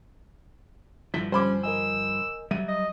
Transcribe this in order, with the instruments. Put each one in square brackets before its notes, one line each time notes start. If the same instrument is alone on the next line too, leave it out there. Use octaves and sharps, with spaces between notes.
[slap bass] G2 D3 F3 [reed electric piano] E4 [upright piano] B6
[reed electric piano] G3 G#6 [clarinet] C#4 [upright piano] C5 B5 D6
[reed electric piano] A#4 D#5 G#5 [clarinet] E6
[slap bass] F#3 G3 [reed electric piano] E5 [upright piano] D#7
[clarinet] D#5